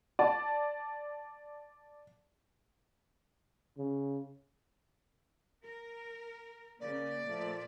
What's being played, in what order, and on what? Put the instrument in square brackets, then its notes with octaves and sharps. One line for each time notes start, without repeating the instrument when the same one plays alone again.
[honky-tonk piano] D5 A5
[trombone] C#3
[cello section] A#4
[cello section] C#3 [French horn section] A#3 [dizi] D5
[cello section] A#2 [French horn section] F3 A3